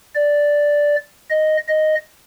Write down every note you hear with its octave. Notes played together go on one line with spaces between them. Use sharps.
D5
D#5
D#5